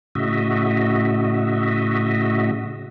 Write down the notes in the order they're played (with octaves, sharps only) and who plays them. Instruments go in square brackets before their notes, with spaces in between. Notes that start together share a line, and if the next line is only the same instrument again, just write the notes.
[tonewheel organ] A2 C#3 F#4 D#5 E5